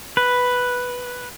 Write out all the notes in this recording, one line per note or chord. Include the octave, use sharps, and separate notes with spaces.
B4